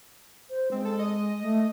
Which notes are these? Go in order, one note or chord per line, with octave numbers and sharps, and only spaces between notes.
C5
G#3 C4
A4
D#5
A3